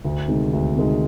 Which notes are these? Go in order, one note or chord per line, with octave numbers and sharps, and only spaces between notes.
D2
C3 D#3 G#3
D2
C3 D#3 G#3